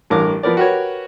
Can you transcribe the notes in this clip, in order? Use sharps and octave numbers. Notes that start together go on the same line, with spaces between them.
A1 G2 A#4 D6
F3 B3 A#4 D5
F#4 G4 A#4 B4 C#5